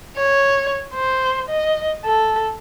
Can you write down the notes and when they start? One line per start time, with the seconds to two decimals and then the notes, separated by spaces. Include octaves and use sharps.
0.17 C#5
0.95 C5
1.49 D#5
2.05 A4